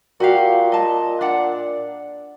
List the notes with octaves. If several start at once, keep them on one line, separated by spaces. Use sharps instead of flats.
A#2 F#4 G4 F5
D#5 A5
D4 D5 F#5